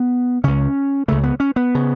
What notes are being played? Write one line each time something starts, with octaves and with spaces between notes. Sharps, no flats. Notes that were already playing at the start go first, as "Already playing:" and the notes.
Already playing: B3
C#2 C#3 C#4
C#2 C#3 A3
B3
C#4
B3
C#3